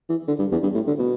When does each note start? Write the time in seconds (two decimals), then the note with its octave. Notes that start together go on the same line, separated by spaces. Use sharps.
0.10 E3
0.28 D3
0.39 G2
0.52 E2
0.63 G2
0.75 A2
0.87 D3
0.99 B2